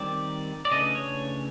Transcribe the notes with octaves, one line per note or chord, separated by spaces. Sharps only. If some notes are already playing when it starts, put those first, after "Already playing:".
Already playing: D#3 G3 C4 D5
D5
C#3 E3 A3 D4 D#5
C#5